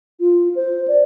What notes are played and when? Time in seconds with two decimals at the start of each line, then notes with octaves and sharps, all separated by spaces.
0.20 F4
0.55 C5
0.88 D5